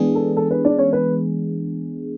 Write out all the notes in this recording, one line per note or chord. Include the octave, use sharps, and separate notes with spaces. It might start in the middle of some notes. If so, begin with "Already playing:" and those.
Already playing: E3 G#3 B3 D4 G#4
A4
A4
B4
D4 D5
C#4 C#5
B4